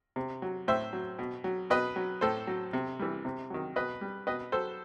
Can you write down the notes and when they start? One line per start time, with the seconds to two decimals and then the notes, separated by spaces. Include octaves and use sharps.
0.16 C3
0.42 F#3
0.68 A2 C5 E5
0.93 F#3
1.19 B2
1.44 F#3
1.70 B2 B4 D#5
1.96 F#3
2.21 A2 A4 C5
2.47 F#3
2.73 C3
2.99 E3 G3
3.25 C3
3.50 D#3 F#3
3.76 B2 B4 D#5
4.01 G3
4.27 B2 B4 D#5
4.52 F#3 A4 C5